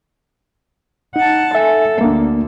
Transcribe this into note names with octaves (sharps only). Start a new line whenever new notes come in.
D#4 F#5 A5
A4 E5 G#5
D2 A#3 D4